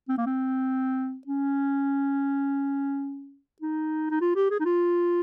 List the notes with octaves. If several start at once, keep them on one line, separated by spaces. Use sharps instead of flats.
C4
A#3
C4
C#4
D#4
D#4
F4
G4
G#4
D#4
F4